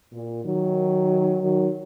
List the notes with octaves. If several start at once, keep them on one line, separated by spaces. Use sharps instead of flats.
A#2
D#3 F#3
D#3 F#3